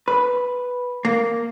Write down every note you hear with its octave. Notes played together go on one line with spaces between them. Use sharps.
B4
A#3